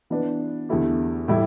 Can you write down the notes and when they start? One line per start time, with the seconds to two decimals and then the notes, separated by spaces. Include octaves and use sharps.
0.10 E3 B3 D4 B4
0.69 E2 D3 A3 E4 G4
1.28 A2 E3 G3 E4